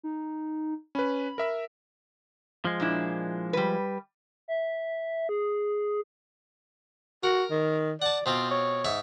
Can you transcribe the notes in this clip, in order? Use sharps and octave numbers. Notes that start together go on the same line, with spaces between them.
D#4
C#4 B4 B5
A#4 E5 E6
F3 G#3
A#2 D4 E4
G3 B4
E5
G#4
F#4 A#4
D#3
D5 F#5 A5
B2 C4 F4 C5
C#5
G#2 E5 C#6